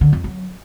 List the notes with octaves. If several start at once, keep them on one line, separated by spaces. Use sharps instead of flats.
D3
F2
F#3